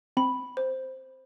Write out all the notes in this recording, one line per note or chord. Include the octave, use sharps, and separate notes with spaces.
C4 B5
C5